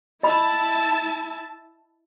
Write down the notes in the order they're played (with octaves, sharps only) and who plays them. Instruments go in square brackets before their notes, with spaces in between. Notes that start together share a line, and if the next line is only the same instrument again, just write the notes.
[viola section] E4 A5 [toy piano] D#5 B5